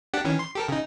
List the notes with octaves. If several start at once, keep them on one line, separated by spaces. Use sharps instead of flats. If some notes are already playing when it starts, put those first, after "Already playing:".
D4 G4 F#5
D#3 E3 C#4
C6
G4 A4 A#4
C#3 D#4